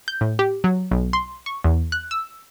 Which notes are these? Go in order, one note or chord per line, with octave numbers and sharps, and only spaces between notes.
G6
A2
G4
F#3
B1
C6
C#6
E2
F#6
E6